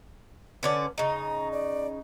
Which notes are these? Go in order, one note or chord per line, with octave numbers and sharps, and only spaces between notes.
D3 C#4 B4 D5
C#3 D#4 A#5
D5